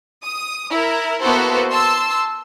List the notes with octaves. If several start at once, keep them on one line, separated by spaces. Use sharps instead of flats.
D#6
E4 A#4
A#3 B3 E4 F#4 A4 C5
A5 C6 E6